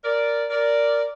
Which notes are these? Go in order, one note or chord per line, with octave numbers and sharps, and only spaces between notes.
A#4 D5
A#4 D5